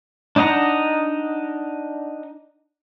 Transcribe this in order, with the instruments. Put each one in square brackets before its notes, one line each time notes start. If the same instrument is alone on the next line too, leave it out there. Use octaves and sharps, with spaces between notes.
[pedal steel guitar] D4 D#4 D#5 F#5 A#5